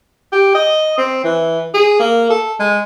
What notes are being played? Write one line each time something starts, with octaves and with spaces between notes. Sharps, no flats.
G4
D#5
C4
E3
G#4
A#3
A4
G#3